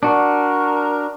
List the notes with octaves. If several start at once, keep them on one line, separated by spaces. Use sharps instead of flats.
D4 F#4 A#4